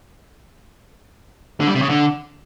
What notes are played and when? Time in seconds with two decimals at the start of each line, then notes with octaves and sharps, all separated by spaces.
1.60 D3
1.68 G3
1.75 C3
1.82 C#3
1.89 D3